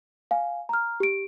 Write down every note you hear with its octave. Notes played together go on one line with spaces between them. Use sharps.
F5 G#5
A#5 F6
G4 D7